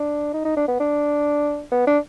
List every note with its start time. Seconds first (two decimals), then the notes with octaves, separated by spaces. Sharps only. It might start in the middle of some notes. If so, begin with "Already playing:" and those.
Already playing: D4
0.33 D#4
0.45 D#4
0.57 D4
0.68 B3
0.80 D4
1.72 B3
1.87 D4